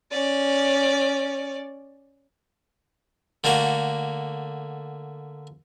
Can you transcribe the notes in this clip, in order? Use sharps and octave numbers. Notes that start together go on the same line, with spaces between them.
C#4 D5
D3 A3 A#3 F#4